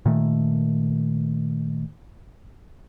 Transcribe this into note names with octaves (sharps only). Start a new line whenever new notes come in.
A#2 D#3 A3